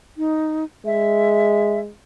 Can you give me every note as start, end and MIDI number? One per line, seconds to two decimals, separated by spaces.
0.17 0.64 63
0.86 1.90 56
0.86 1.80 76